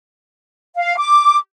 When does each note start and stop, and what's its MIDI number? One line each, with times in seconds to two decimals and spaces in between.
0.75 0.97 77
0.98 1.37 86